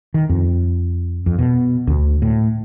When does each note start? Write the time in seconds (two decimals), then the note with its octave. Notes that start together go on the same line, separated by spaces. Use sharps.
0.14 D#3
0.29 F2
1.26 F2
1.39 B2
1.87 D2
2.22 A2